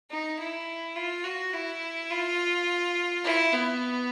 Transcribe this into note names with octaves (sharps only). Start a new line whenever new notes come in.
D#4
E4
F4
F#4
E4
F4
E4
B3